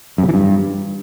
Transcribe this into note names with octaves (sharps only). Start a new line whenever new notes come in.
F#2
C3
E3
G2